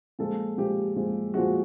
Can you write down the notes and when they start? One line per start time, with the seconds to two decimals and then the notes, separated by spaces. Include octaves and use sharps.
0.19 A#2 F3 G#3 A4
0.58 A#2 F3 G#3 G4
0.96 A#2 F3 G#3
1.34 A#2 F3 G#3 F#4